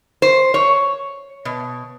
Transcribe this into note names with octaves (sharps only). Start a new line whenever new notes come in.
C5
C#5
B2